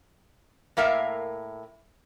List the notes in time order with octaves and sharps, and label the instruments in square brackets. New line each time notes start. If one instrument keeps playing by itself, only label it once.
[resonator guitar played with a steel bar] A2 A#3 A#4 E5 F5